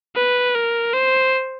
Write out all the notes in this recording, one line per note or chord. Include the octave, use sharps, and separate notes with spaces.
B4
A#4
C5